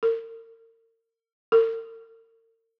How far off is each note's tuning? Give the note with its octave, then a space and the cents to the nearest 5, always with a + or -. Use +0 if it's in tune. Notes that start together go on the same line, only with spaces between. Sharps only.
A#4 -40
A#4 -45